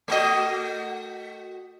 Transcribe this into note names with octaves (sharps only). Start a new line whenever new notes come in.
A3 F#4 D#5